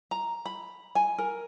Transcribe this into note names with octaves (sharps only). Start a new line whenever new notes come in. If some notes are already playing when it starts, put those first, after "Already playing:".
A#5
B5
G#5
A#4